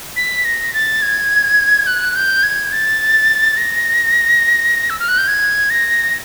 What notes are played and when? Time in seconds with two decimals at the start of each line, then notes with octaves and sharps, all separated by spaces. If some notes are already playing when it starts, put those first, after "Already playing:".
0.16 B6
0.45 A#6
0.74 A6
1.02 G#6
1.87 F#6
2.16 G6
2.43 G#6
2.72 A6
3.57 A#6
4.90 E6
5.00 F6
5.08 F#6
5.18 G6
5.28 G#6
5.70 A#6